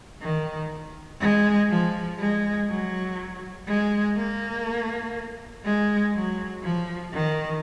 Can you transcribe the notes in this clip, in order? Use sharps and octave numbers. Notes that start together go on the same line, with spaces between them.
D#3
G#3
F3
G#3
F#3
G#3
A#3
G#3
F#3
F3
D#3